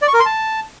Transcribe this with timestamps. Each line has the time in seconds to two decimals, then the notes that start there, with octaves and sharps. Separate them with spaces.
0.02 D5
0.08 C#6
0.14 A#4
0.20 C6
0.26 A5